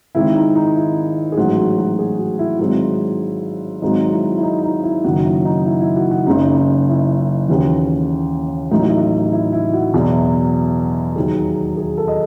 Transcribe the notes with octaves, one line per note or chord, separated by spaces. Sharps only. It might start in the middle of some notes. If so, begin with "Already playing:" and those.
G#1 G#2 D#3 E4
D#4
D#4
E4
G#4
A1 G#2 F#3 F#4
F#4
F#4
G#4
F#4
E4
G#1 G#2 F#3 E4
G#1 G#2 F#3 D#4
E4
E4
D#4
D#4
E4
F#1 F#2 D#3 F#3 F#4
E4
D#4
E4
E4
F#4
E4
F#4
F#1 F#2 C#3 D#4
D#4
E4
E4
D#2 C#3 E3 F#4
A1 A2 F#3 D#4
E4
D#4
E4
E4
E4
F#4
E2 B2 F#3 E4
D#2 D#3 F#3 G#4
G#4
A4
D#5